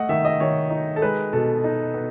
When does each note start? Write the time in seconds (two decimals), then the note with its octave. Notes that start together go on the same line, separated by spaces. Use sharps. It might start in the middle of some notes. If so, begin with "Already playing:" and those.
Already playing: A3 D#5 F#5
0.09 D#3 E5
0.25 D#5
0.40 D#3 C#5
0.70 D#4
0.96 A4
1.02 G#3 B4
1.33 B2 A4
1.64 D#4
1.94 B3